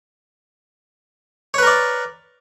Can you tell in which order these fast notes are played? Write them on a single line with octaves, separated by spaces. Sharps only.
C#5 B4 A#4 D5